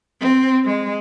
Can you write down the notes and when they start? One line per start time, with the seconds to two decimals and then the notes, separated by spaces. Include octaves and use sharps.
0.21 C4
0.65 G#3